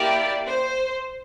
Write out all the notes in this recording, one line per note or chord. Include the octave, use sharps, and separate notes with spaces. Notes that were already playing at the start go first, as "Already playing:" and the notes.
Already playing: A#3 E4 G4 D5
C5